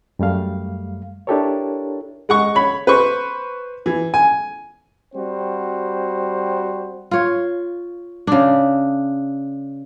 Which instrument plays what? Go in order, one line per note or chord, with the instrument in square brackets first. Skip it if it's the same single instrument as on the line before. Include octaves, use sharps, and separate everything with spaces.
[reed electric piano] F#2 G3 A3 F5
D4 E4 G4 A4 A#4 C#5
[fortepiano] G#3 F#5 C#6
C#5 B5
B4 C5 C#6
E3
G#5
[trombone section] G3 C4 F#4 C5
[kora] F4 C#5
C#3 D4